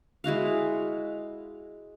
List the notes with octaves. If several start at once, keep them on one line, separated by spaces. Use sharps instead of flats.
G#3 E4 F#4 F5